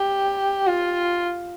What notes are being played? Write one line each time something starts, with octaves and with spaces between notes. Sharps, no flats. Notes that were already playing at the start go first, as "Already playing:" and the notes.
Already playing: G4
F4